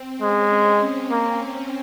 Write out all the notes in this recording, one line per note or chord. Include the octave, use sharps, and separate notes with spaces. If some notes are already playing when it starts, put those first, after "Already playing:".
Already playing: C4
G#3 C#4
A#3